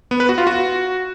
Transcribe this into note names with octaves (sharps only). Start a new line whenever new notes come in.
B3
B4
F#4
F4
F#4